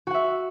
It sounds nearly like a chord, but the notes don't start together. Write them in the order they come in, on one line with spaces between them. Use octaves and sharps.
F#4 F#5 E5